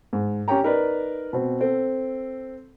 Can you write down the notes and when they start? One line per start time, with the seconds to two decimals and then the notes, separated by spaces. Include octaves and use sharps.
0.13 G#2
0.48 C#4 G4 C#5 G5 A#5
0.63 D#4 A#4 B4 D5
1.33 B2 C4
1.61 C4 A4